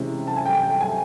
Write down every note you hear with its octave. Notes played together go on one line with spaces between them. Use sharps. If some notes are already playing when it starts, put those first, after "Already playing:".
Already playing: C3 E3 G#3 C#4 E4 E5
A5
G#5
G5
G5
G#5